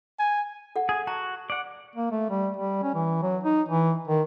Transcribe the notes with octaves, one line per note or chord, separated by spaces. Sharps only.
G#5
A4 F#5
G#4
F#4 A5 A#5
D5 F#5
A#3
A3
G3
G3
C#4
E3
F#3
D#4
E3
D#3